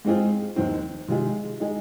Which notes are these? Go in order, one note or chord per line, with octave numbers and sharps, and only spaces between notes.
G#2 G#3 C4 F4 G#4
D#2 D#3 C4
C3 D#3 G#3 F4 G#4
G#3 D#4 G#4